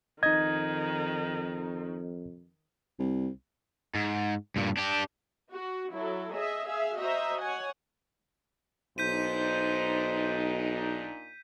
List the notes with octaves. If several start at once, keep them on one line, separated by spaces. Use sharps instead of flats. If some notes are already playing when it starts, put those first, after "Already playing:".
F2 D#3 D#4 D#5 G#6
C2
G#2
G2 A#2
D4 G4
F#4
F#3 E4 A4
G#4 D#5 E5
G#4 E5 F5
F#4 C5 D#5 E5 A#5
C#5 F#5 G#5
B1 A#2 D4 D#4 C5 G6 B6 D#7